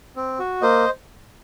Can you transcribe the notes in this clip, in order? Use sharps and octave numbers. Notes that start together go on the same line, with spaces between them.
C4
F#4
A#3 C5 D#5